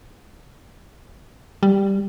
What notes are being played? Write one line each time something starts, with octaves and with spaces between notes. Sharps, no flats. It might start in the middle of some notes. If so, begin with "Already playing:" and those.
G3